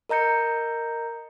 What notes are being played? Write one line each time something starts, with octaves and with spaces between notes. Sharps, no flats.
A#4 D#5 A#5 G6 C#7